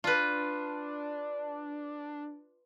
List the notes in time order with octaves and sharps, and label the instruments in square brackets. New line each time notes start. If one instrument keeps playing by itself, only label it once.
[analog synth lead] D4 [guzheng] F4 B4